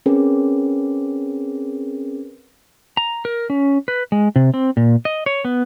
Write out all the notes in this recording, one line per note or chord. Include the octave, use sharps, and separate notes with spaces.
C4 C#4 G#4 A#4 B4
A#5
A#4
C#4
B4
G#3
C3
C4
A#2
D#5
C#5
B3